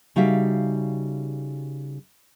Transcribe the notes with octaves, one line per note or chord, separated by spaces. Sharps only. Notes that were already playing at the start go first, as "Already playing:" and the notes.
C#3 G3 D#4 F#4 E5 F5